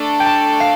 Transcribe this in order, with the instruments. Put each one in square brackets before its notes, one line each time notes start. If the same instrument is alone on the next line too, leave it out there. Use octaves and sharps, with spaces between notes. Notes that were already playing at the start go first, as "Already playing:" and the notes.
Already playing: [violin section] A3 D4 A4 D5
[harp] G5
A5
F5